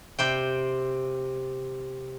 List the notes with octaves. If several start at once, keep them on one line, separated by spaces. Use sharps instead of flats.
C3 C5 G5